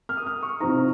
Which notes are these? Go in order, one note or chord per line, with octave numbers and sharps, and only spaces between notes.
F6
D#6
F6
C#6
F2 C3 F3 C4 D#4 A#5